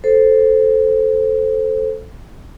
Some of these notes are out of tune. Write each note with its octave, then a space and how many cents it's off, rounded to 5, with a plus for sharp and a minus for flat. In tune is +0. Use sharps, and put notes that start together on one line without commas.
A4 +0 C5 +0